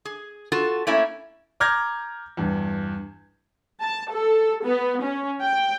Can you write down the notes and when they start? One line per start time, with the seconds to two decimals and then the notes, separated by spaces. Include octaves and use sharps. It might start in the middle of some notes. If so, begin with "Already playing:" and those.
0.05 G#4
0.52 F4 F#4 A4
0.87 A3 A#3 C#4 E4 E5
1.60 A#5 D6 F6 G6 G#6 A#6
2.37 E2 G2
3.81 A5
4.11 A4
4.65 B3
5.02 C#4
5.40 G5